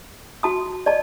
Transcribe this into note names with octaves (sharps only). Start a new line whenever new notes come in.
F#4 A5 D#6
D5 D#5 A5